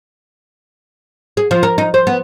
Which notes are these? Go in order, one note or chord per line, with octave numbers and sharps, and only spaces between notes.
G#4
F3
A#4
D#4
C5
B3